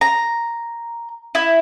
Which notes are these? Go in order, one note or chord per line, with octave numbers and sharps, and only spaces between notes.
A#5
E4